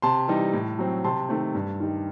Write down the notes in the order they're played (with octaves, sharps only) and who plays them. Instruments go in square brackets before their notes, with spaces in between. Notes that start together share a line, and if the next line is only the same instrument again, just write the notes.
[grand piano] C3 A5 C6
E3 G3 D#4
A2
F#3 C4
C3 A5 C6
D#3 A3 C4
G2
D#3 G3 D#4